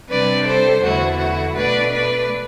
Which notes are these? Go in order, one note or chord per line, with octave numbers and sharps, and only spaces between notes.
C3 G3 D4 B4 D5
A4 C5
E2 D3 A3 E4 F#4
F#4
B2 A3 D4 B4 D5
B4 D5